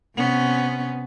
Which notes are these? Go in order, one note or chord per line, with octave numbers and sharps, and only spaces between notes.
C3 B3 C#4